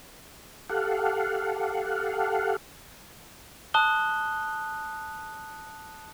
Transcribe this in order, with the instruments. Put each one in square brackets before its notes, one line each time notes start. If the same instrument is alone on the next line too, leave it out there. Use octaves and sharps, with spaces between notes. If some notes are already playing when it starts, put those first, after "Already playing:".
[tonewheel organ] G4 A4 F5 F#5
[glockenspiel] A5 D#6 F#6 G7